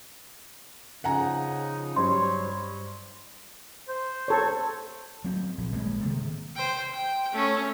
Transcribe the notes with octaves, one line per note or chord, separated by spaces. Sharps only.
C#3 F3 D#4 F#5 G#5 A#5
G2 F#3 C5 C#5 C6
C5
A4 C#5
F#3 C4
A#1
A1 G#3 A#3
C3 D#3
C5 G5
G5
A3 C#4